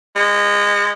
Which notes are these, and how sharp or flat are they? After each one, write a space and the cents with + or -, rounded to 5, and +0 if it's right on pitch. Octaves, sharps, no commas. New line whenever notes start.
G#3 -25